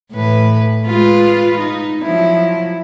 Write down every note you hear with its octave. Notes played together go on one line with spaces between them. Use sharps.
A2 E3 B4
G#3 F4 B4
D#4
F3 F#3 E4